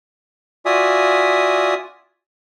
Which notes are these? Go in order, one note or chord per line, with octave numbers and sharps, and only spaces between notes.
F4 F#4 D5 E5 G#5 D#6